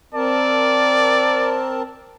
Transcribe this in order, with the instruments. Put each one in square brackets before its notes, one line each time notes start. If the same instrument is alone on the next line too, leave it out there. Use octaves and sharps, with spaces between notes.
[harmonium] C4 A#4 A5 [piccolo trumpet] D5